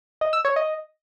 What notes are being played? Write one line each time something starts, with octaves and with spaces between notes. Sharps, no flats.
D#5
E6
C#5
D#5